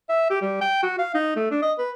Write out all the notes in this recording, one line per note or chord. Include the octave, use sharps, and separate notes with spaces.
E5
G4
G3
G5
F#4
F5
D#4
A3
D4
D#5
B4